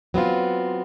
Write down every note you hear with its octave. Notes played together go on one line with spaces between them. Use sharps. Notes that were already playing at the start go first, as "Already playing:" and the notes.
F#3 B3 C4 F4